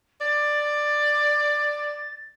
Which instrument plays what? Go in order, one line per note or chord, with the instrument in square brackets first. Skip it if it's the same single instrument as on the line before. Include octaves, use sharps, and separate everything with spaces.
[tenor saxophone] D5 [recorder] A6